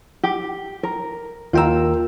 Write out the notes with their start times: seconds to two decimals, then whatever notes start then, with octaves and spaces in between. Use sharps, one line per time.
0.24 G4
0.83 A#4
1.53 D#2 F4 A#4 G5 A#5 E6